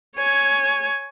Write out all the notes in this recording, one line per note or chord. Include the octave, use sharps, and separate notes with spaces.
C#5 G#5